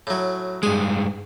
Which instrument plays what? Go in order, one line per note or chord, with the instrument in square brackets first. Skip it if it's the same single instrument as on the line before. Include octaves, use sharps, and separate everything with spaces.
[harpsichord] A2 F#3
[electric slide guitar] G2 G#3 [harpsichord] G#4